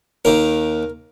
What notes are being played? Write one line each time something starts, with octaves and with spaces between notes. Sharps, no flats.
D#2 D#3 A#4